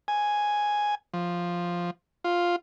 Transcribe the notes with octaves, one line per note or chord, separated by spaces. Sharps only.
G#5
F3
F4